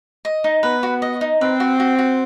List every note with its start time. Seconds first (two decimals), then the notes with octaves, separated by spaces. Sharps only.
0.25 D#5
0.44 D#4
0.63 B3 B4
0.83 F#4
1.02 D#5
1.21 D#4
1.41 C4 B4
1.60 F#4
1.80 F#4
1.99 F#4